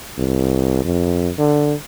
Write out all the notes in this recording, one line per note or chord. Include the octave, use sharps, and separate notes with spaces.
C2
F2
D3